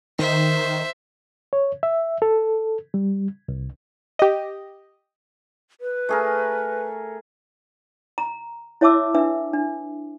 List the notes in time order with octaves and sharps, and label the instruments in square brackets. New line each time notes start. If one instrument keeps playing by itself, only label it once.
[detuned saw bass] D#3 [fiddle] C5 E5
[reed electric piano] C#5
E5
A4
G3
C2
[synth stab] G4 D#5
[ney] B4
[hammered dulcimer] A3 G#4 A#4
[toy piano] A#5
E4 C#5 E5 A5 D6 E6
D4 B4 E5
D4